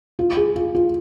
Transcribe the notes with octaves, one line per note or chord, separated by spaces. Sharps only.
F4
G#4
F4
F4